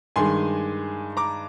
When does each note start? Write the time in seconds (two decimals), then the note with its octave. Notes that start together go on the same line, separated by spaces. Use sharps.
0.16 G2 D#3 G#3 G#5 C6
1.17 A#5 D6